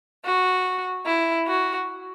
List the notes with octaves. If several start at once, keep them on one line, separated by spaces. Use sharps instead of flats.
F#4
E4
F#4